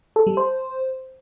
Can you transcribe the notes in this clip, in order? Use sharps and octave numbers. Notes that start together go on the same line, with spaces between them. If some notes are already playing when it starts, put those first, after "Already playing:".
A4
G3
C5